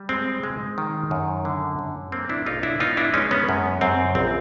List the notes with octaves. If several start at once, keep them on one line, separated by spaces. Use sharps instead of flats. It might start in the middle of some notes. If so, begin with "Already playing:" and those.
Already playing: G3
G#3 C4
G#3
D#3
F#2
D3
F#2
A#3 C4
D4 E4
B1 D#4 F4
D4 E4
B3 D#4 F4
D4 E4
G#3 C#4 D#4
B3 C#4
F#2
F#2 C4
A#1 C4